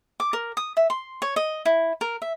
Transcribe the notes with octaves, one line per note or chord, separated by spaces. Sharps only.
D6
A#4
D#6
E5
C6
C#5
D#5
E4
A#4
E5